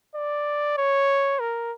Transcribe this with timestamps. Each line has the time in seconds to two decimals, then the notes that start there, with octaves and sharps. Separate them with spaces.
0.16 D5
0.78 C#5
1.40 A#4